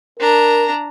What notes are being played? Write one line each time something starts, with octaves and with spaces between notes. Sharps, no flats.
D4 A#4 A#5